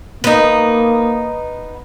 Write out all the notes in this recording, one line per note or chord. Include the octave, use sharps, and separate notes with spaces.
A#3 B3 D#4